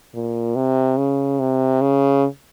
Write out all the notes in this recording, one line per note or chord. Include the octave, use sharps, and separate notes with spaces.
A#2
C3
C#3
C3
C#3